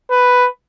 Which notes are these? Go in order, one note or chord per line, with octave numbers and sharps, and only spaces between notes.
B4